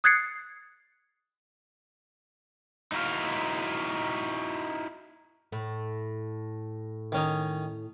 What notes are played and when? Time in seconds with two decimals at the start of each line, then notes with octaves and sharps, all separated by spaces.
0.04 D#6 F#6 G#6 A6 C7 C#7
2.92 D#4 E4 F#4 A4 F5
5.52 A2
7.12 D#3 C#4 D#4